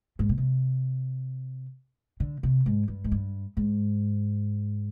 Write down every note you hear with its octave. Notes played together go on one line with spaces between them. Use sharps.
G#2
B2
C3
D3
C3
G#2
G2
G#2
G2
G#2